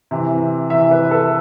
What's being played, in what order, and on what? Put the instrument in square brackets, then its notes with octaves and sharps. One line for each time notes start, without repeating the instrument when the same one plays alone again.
[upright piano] C3 E3
C3 E3 E5
B4
A4